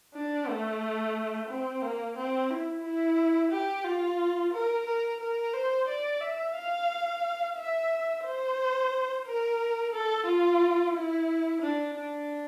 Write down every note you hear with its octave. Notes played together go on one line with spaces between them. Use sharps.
D4
A3
C4
A#3
C4
E4
E4
G4
F4
A#4
A#4
A#4
C5
D5
E5
F5
E5
C5
A#4
A4
F4
E4
D4
D4